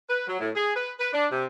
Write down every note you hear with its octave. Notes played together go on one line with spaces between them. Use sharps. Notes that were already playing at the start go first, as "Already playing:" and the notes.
B4
F#3
A2
G#4
B4
B4
D4
C3